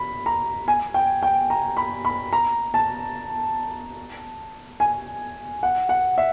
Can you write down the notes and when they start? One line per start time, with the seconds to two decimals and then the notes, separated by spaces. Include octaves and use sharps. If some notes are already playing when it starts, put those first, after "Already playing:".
Already playing: B5
0.26 A#5
0.68 G#5
0.94 G5
1.23 G5
1.50 A#5
1.77 B5
2.05 B5
2.33 A#5
2.74 A5
4.80 G#5
5.63 F#5
5.89 F#5
6.18 E5